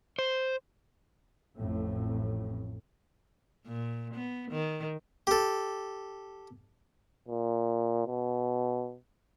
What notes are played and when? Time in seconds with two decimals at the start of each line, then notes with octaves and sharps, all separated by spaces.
0.19 C5
1.57 A1 F2 A2
3.67 A#2
4.14 B3
4.51 D#3
5.27 G4 A4
7.28 A#2
8.07 B2